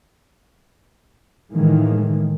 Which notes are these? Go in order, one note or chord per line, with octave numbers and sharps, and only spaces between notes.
A2 D#3 E3 G#3 A#3